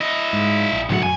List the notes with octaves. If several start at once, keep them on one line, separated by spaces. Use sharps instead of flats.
E4 D#5
G#2
A#1
B1 A2 D3 F#3 F#5
F#2 G#5